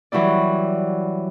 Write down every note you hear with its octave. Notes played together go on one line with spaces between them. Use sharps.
E3 F#3 G3 E4 D5